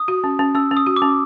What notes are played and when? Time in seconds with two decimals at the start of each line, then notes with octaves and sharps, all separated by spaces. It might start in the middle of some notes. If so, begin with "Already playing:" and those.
Already playing: D#6
0.08 F#4
0.24 C#4
0.39 C#4
0.55 C#4 E6
0.71 C#4
0.77 D#6
0.87 F#4
0.96 D6
1.02 C#4